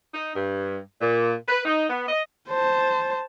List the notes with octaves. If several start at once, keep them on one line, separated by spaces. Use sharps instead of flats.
D#4
G2
A#2
B4
D#4
B3
D#5
C5 A5